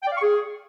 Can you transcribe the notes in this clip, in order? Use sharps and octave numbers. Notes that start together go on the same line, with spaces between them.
G5
D5
F5
C#6
G#4